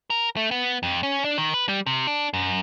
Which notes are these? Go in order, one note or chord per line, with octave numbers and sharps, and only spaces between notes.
A#4
A3
B3
F2
C#4
D4
D#3
B4
G3
C3
D4
F#2